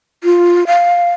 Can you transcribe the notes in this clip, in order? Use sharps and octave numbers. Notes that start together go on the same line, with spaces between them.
F4
F5